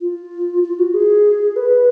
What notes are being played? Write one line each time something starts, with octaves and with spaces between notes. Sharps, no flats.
F4
F4
F#4
G#4
B4